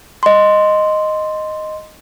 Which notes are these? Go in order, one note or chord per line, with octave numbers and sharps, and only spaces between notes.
D#5 C6